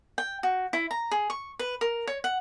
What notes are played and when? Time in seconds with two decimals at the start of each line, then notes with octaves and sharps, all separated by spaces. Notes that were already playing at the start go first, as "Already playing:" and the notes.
0.18 G5
0.43 F#4
0.73 E4
0.91 A#5
1.11 G#4
1.30 C#6
1.59 B4
1.81 A#4
2.07 C#5
2.24 F#5